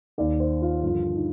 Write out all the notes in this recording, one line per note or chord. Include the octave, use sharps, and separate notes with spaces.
D#2 D#3 D5
C5
F4
G2 D3 F3 F4
D#4